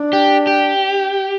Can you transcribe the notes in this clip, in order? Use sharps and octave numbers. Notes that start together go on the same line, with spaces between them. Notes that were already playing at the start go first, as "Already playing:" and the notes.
Already playing: D4
G4
G4